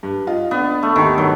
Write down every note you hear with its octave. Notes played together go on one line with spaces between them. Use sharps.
G2
F4 D#5
B3 D4
A3
D#2 D#3 G4
G2 D#3 F#3